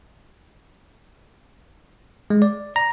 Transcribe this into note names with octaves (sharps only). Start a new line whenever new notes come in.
G#3
D5
A#5